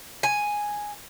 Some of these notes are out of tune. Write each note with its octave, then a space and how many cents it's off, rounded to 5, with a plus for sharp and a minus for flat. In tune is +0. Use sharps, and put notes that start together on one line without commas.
G#5 +0